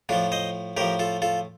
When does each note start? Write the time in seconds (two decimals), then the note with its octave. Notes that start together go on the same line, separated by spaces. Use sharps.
0.09 A2 F3 D4 F4
0.32 C5 D#5
0.77 A2 F3 G4 A#4
0.99 F4 A4
1.22 F4 A4